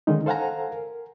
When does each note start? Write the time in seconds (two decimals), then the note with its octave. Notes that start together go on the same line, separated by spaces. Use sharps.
0.07 D3 D#3 G#3 C#4 D#4
0.26 A4 C5 F5 F#5 G#5 A#5
0.71 A#4